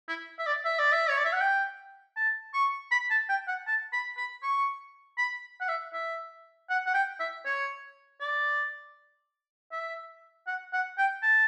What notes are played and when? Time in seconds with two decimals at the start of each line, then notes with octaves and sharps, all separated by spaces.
0.08 E4
0.39 E5
0.47 D5
0.65 E5
0.79 D5
0.92 E5
1.10 C#5
1.18 D5
1.25 E5
1.33 F#5
1.41 G5
2.16 A5
2.54 C#6
2.91 B5
3.10 A5
3.29 G5
3.48 F#5
3.67 A5
3.93 B5
4.17 B5
4.43 C#6
5.18 B5
5.61 F#5
5.68 E5
5.93 E5
6.70 F#5
6.86 F#5
6.94 G5
7.20 E5
7.45 C#5
8.21 D5
9.72 E5
10.47 F#5
10.73 F#5
10.98 G5
11.23 A5